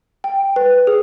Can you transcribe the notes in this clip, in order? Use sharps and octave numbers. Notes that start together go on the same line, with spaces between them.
G5
B4
G#4